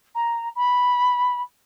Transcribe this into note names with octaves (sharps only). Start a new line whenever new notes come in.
A#5
B5